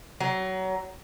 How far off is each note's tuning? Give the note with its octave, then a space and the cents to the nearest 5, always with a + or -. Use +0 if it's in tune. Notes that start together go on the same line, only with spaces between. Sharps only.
F#3 +25